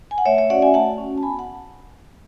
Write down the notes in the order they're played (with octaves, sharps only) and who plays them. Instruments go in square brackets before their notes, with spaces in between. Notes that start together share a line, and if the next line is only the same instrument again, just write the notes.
[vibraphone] G#5
F#5
A3 C#5 E5
C#5 E5
C#4 F#4 D5 F#5
E5 G#5
A3 F#5 A5
C#4 F#4
A5
B3 G#5 B5
F#5 A5